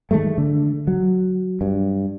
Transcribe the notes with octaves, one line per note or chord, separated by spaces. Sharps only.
D#3 F3 G#3 A3
D3
F#3
G2